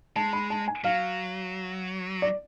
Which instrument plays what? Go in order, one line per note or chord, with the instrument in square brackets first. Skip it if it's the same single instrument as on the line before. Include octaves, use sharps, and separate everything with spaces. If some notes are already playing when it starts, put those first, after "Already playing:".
[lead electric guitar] G#3 [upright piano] A5
[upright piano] B5
A5
G#5
[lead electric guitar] F#3 [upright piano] F5
[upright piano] D5